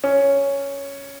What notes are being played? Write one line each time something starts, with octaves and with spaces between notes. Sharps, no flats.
C#4